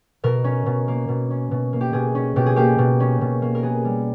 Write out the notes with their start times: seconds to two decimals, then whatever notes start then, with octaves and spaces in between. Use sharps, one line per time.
0.24 B2 A#4
0.44 C#4
0.66 B2
0.88 A#3
1.08 B2
1.30 C#4
1.51 B2
1.73 A#3
1.81 G4
1.93 B2 G#4
2.15 C#4
2.36 B2 G4
2.46 G#4
2.56 A#3 G4
2.78 B2
3.00 C#4
3.21 B2
3.42 A#3
3.55 A#4
3.63 B3 G#4
3.85 G3